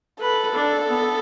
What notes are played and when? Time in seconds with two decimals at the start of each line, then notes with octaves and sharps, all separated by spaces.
0.21 A4 B4
0.55 D4
0.88 B3